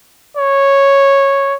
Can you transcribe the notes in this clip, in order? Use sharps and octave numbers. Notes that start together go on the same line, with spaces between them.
C#5